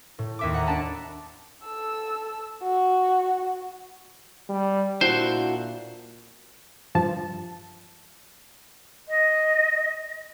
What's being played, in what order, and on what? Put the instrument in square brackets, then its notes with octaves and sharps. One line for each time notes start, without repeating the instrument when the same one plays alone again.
[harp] A2
D#2 E5 D6
F#5 A#5
D4 D5 A5 B5
[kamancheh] A4 E6
F#4
[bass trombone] G3
[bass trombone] A#2 [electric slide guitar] D4 E4 F#4 [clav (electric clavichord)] C5
[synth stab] G2 F3 A5
[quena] D#5